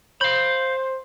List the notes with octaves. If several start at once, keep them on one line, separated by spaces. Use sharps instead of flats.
C5 F5 B5 G6